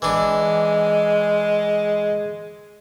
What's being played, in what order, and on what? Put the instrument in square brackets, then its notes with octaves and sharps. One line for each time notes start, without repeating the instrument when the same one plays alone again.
[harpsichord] E3 D4 [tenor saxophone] G#3